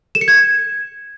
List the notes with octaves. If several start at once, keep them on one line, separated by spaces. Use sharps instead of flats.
E7
C#7
G#6